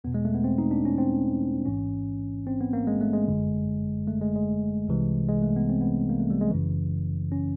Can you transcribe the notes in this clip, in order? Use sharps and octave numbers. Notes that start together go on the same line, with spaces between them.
E2 B2 B3
G#3
A3
B3
C4
D#4
D4
C#4
C4
A1 G#2 E3 C#4
C4
B3
A#3
G#3
A3
G#3
G1 F#2 D3
A3
G#3
G#3
C2 C3 E3
G#3
A3
B3
C4
B3
A#3
A3
G3
G#3
G1 F#2 C#3 E3
C#4